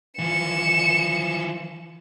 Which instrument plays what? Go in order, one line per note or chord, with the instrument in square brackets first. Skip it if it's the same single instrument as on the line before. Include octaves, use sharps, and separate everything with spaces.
[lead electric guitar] E3 F3 [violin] C#7 E7